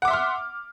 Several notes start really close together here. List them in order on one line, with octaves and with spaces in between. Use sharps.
F#5 D6 E5 C6 F6